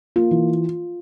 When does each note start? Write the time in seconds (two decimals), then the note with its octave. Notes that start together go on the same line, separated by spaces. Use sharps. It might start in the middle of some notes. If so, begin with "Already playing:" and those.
0.16 A#3 F4
0.31 E3